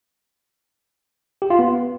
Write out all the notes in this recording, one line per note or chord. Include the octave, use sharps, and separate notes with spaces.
G4
F4
B3